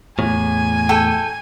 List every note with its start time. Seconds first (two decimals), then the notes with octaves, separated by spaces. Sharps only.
0.19 E2 A2 G#5
0.89 A4 G5